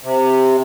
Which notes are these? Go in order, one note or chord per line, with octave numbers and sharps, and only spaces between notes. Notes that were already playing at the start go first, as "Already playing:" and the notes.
C3